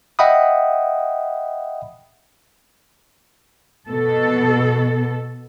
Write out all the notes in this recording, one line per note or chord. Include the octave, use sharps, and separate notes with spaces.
D#5 E5 F#5 G5 B5 D#6
B2 A4